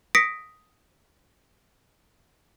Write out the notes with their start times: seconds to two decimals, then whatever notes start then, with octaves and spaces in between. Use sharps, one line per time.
0.15 D#6 A#6 B6 C#7 D7